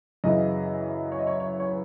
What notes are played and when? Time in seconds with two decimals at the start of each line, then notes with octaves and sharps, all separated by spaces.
0.24 F#2 C#3 E3 D#5
1.12 C#5
1.19 D#5
1.27 C#5
1.40 C#5
1.60 C#5
1.69 B4